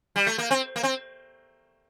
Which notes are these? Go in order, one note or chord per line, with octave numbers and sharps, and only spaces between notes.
G3
A3
A#3
C4
A#3
C4